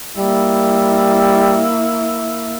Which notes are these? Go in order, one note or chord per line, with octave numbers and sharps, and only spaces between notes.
G3 A#3 E4